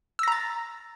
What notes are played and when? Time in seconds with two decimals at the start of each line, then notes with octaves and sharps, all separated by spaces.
0.19 E6
0.23 A#6
0.28 A#5
0.32 A6